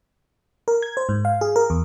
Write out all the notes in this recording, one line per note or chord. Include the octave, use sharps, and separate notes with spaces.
A#4
G#6
C5
G#2
F5
G#4
A#4
E2